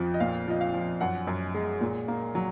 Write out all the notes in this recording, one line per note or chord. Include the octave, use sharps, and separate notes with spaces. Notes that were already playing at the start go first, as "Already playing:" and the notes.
Already playing: F2 F3
D#5
A#2 F5
F3 D#5
F5
F3
F#2 F#5
F#2
G#3
A#2
A#3
F#3